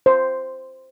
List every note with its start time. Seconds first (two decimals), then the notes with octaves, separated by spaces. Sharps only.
0.06 C5